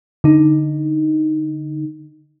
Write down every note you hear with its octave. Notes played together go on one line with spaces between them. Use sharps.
D3 D#4